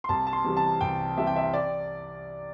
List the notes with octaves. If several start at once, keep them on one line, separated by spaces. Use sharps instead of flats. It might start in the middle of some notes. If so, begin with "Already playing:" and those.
C6
C2 A5
A5
C6
C3 E3 G3
A5
C2 G5
C3 E3 G3 E5
G5
E5
D5